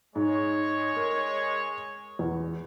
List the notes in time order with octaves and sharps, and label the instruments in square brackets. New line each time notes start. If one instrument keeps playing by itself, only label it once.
[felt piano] G#2 [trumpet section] G#3 C#5
[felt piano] A#4
E2